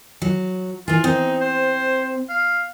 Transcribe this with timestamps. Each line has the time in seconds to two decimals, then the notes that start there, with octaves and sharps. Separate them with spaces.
0.22 F#3
0.88 E3 F4 G#4
1.04 C4 D#4
1.41 C5
2.29 F5